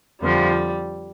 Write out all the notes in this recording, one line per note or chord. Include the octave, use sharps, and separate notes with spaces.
F2 D3 F3 G3